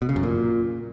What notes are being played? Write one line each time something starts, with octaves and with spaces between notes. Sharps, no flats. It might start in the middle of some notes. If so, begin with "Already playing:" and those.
B2
C#3
F#2
A#2